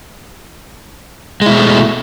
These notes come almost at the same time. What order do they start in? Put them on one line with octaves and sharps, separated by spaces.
G#3 E4 B2 A3